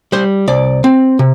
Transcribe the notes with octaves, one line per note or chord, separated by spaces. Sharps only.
G3 C5
C2 D5
C4
C3